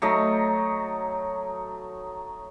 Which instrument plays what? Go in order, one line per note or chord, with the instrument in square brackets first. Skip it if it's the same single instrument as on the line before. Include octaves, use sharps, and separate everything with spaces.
[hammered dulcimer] F#3 A3 D#4 D#5